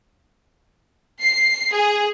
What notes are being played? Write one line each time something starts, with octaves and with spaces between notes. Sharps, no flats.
C7
G#4